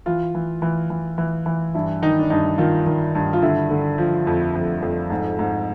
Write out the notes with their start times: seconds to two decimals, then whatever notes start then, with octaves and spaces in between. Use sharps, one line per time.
0.06 E3 F4
0.35 E3
0.62 E3
0.90 E3
1.18 E3
1.46 E3
1.74 G2 E4
2.02 D#3 D#4
2.19 D4
2.30 G2 D#4
2.58 D#3 F4
2.86 D#3
3.15 G2
3.33 F4
3.42 D3 E4
3.70 D3
3.98 F3
4.27 F2
4.55 F2
4.82 F2
5.10 G#2
5.39 G#2